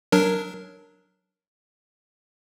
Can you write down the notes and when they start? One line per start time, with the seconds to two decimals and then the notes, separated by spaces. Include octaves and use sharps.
0.12 F#3 D4 A#4